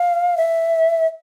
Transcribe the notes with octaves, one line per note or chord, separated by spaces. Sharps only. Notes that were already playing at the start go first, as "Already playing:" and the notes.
Already playing: F5
E5